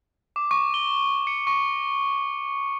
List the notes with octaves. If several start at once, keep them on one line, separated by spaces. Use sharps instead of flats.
D6
C#6
G7
C#7
C#6